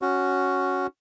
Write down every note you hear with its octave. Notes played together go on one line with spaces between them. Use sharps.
C#4 F#4